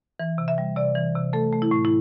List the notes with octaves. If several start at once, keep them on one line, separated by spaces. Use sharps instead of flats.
E3
C3
E5
G3
C3 D5
E3
C3
A3 A4
A3
E4
A2
E4